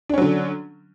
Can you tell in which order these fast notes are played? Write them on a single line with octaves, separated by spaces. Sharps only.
D4 C#4 F#3 D3